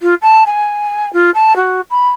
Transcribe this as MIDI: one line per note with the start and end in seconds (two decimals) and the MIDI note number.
0.02 0.14 65
0.22 0.43 81
0.46 1.12 80
1.13 1.31 65
1.34 1.55 81
1.56 1.81 66
1.90 2.10 83